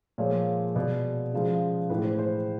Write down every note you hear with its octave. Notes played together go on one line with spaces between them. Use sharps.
A#2 F3 G#3 C#5
B2 G#3 D5
C#3 F3 G#3
A2 E3 G#3 B4
C5
C5